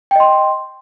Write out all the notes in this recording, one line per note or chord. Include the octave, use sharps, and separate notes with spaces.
D#5 G5 C6